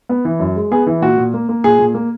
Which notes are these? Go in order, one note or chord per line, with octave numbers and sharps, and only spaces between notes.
B3
E3
F#2
G#3
B3 G#4
E3
A#2 F#4
A#2
A#3
A#3
A#2 G#4
A#2
A#3